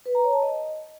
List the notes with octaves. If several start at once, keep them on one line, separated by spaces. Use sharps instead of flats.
B4
A#5
C#5
A5
D#5